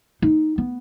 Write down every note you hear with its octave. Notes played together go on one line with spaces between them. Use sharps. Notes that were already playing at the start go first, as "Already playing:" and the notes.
D#4
B3